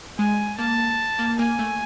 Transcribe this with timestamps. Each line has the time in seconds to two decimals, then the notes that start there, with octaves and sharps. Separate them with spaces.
0.19 G#3 G#5
0.58 A#3 A5
1.19 A#3
1.39 A#3 G#5
1.59 A3